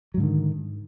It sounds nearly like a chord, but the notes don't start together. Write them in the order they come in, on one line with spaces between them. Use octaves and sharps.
F#3 G#2 D3 D#3